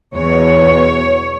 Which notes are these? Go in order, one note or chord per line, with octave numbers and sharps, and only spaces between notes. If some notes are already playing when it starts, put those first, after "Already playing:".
E2 B2 C#5